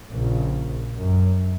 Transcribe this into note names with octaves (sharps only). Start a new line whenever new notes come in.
A#1 A#2 C#3
F#2